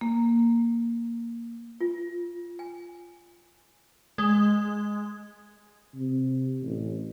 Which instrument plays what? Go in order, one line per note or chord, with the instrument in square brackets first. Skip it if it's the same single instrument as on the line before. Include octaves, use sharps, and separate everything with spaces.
[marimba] A#3
[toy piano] F4
G#5
[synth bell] G#3
[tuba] C3
A1